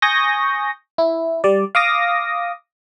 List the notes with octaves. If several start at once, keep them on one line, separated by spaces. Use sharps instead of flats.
G#5 C#6 D#6 G6 A#6
E4
G3 D5
F5 D6 D#6 A#6